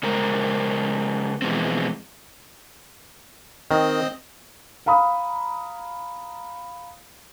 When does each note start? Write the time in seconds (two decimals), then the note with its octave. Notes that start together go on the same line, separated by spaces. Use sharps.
0.03 C#3 G#3 A#4 C5
1.42 B2 E3 F3 G#3 B3 C4
3.71 D#3 C4 D#5
4.86 F5 A#5 B5 D#6